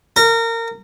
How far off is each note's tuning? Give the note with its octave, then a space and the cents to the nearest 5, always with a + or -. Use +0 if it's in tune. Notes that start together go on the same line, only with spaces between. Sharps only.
A#4 -25